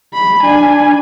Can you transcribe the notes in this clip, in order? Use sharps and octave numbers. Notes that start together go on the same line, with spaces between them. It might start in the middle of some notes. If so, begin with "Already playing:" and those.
B5
D4 G#5